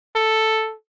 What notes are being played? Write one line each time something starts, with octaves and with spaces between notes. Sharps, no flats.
A4